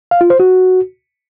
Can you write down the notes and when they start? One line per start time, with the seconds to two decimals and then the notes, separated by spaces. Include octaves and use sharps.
0.11 F5
0.21 F4
0.30 C5
0.40 F#4